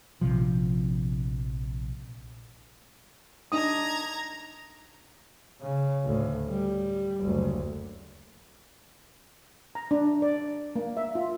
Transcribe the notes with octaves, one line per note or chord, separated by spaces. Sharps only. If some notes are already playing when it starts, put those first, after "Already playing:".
A#1 C3 F3
D4 D#4 A#5 D#6 G#6
C#3
D2 A2
G3
F#1 D2
A#5
D4
D5
A#3
E5
F4